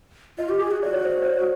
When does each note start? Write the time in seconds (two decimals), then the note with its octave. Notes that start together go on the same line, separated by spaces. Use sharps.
0.38 F4 D#5
0.49 G4
0.60 G#4
0.71 F#4
0.82 F#4 D5
0.93 C#5
1.05 C5
1.16 C5
1.22 D5
1.26 C#5